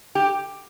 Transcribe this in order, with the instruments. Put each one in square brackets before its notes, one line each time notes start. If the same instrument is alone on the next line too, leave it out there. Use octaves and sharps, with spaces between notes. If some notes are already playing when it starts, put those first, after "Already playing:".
[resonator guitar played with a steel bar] G4